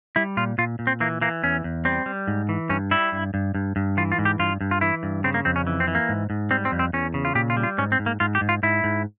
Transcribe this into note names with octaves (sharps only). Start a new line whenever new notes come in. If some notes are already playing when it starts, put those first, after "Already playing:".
G3 E4
A#2 F4
A#2 F4
A#2
C4
E3 A#3
E3 A#3
E2 C#4
E2
G3 C4
G3
G#2
E3
G2 C#4
G3 E4
G2
G2
G2
G2
E3 F4
F4
G#2
G4
G2 F4
G2
F4
E3 E4
G2
C#3 C4
A#3
F2 C4
C#4
E3
C4
E3
A#3
G#2
G#2
G3 C4
C4
F2
C4
E2 C#4
C#3
F4
A#2 G4
F4
G3
F4
G#2 C#4
C4
G#2
A#3
G#2 F4
G4
G#2
F4
G#2 E4
G#2